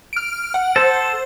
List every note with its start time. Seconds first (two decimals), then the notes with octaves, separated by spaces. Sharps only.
0.13 F6 D7
0.54 F#5
0.76 A4 C5